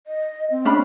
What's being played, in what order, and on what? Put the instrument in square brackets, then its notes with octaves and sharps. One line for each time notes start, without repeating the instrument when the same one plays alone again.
[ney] D#5
C4
[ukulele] C#4 D4 B5